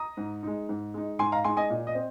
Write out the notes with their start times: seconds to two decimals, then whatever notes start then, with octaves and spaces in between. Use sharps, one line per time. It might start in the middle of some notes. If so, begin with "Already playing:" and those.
Already playing: A#5 D#6
0.17 G#2
0.43 G#3 D#4
0.69 G#2
0.94 G#3 D#4
1.19 G#2 G#5 C6
1.32 F5 A#5
1.44 G#3 D#4 G#5 C6
1.57 D#5 G#5
1.70 A#2
1.87 D#5
1.95 C4